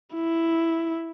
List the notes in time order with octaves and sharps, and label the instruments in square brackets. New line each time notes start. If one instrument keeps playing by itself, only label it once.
[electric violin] E4